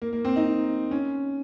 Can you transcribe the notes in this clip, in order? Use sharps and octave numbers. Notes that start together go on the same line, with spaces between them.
A#3
A#3
C4
D#4
C#4